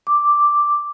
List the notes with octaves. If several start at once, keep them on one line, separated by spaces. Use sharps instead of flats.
D6